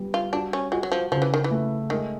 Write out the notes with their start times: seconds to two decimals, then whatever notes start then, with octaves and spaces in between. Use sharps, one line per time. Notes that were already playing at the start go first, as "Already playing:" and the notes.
Already playing: G3 B3
0.14 F4
0.33 D4 F#4
0.53 C#4
0.72 G#3 F#4
0.83 F#3
0.92 F3
1.11 C#3 F3
1.22 E3
1.34 D#3
1.44 E3
1.51 A3
1.90 D#3 G#3